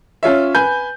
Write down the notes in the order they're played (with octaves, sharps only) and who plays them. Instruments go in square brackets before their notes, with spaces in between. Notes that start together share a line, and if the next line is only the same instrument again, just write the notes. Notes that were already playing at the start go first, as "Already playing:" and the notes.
[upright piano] C#4 F4 C#5 E5
B4 G#5 G6